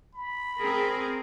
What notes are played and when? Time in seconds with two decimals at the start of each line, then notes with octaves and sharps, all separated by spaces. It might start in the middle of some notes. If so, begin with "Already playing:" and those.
0.14 B5
0.60 C4 G#4 A#4